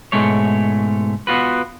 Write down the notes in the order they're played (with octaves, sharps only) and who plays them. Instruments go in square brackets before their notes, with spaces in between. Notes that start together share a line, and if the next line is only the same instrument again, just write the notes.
[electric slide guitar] G#2 B2 G#3 A3 C#5
B3 F4 F#4 B4